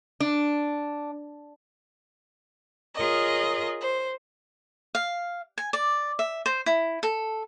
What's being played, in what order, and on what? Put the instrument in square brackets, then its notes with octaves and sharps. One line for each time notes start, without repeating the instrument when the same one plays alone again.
[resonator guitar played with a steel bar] D4
[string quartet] F4 G#4 A#4 C#5 D#5
C5
[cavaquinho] F5
G#5
D5
E5
C5
E4
A4